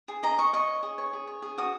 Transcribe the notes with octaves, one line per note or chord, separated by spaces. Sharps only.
G#4
D#5 A#5
D#5 C#6
D#5 C#6
C#5
G#4
C#5
G#4
C#5
G#4
F#4 D#6